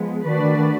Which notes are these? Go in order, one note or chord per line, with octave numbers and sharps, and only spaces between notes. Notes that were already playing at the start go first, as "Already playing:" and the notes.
Already playing: F3 G#3 B3
D#3 A3 D4 F#4 B4 D5
D#3
D#3